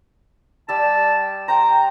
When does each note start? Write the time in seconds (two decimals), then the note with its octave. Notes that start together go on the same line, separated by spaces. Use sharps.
0.69 G3 E5 A5
1.48 C5 G5 A#5